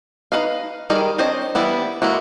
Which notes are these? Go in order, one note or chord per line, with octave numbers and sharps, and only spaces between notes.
D#4 E4 B4 D#5 F5
D#3 G3 D#4 G#4 A#4
C4 D4 C5 C#5 D#5
E3 G3 B3 E4
G#3 A#3 E4 F#4